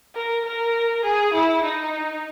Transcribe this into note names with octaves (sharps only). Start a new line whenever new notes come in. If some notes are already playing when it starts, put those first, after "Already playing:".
A#4
A#4
G#4
E4
D#4